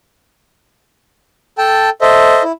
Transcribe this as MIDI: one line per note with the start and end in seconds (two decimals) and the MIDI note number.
1.58 1.90 69
1.58 1.90 79
1.58 1.90 81
2.01 2.43 69
2.01 2.43 72
2.01 2.43 75
2.01 2.43 76
2.43 2.52 64